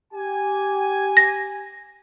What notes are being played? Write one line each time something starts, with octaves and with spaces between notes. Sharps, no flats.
G4 G#5
A#6